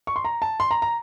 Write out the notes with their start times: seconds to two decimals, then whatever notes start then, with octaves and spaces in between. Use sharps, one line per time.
0.07 C#6
0.16 C6
0.25 A#5
0.42 A5
0.60 C6
0.71 A#5
0.82 A#5